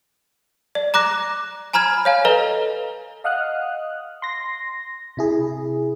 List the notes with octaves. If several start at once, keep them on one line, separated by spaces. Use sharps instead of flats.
D5
A#5 D6 F#6 A#6
G#5 A#5 B5 F6 G#6
C#5 F5 G#5
A4 B4 D#5 A#5
D#5 F5 F#5 D#6 F6 F#6
C6 A#6
C3 E4 G#4